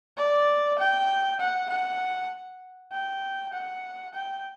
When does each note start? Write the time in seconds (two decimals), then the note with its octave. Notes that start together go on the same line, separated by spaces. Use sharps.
0.17 D5
0.79 G5
1.40 F#5
1.70 F#5
2.92 G5
3.53 F#5
4.14 G5